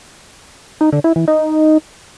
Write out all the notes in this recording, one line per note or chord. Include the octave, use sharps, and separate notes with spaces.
D#4
D3
E4
E3
D#4